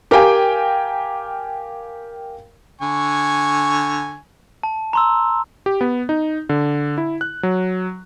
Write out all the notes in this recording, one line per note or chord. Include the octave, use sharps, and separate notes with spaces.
G4 A#4 F5 G5 G#5
D3 G#5 C#6
A5
A#5 C6 E6
G4
B3
D#4
D3
E4
F#6
F#3